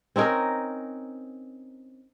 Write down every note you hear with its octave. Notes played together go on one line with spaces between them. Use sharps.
C4 C#4 D#4 A#4